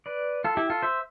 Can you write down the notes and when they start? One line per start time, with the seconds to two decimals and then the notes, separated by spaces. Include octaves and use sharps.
0.06 B4 D5
0.44 F4 A4
0.57 E4 G4
0.70 F4 A4
0.82 C5 E5